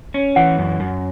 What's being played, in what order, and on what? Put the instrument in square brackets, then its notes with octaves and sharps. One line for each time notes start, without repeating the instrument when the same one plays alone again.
[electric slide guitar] C#4
[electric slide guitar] E3 [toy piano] F#5
[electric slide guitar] F#2
F#2